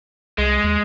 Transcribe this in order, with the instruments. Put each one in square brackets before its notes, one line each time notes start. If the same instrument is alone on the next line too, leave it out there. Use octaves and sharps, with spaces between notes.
[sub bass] C2 [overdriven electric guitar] G#3
[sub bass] D#2